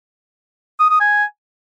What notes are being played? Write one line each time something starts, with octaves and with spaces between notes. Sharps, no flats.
D#6
D#6
G#5